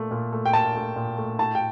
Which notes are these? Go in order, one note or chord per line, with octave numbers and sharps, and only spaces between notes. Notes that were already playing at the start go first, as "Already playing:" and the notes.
Already playing: A#2 A3
A#2
A3
G5
A#2 A5
A3
A#2
A3
A2 A5
G5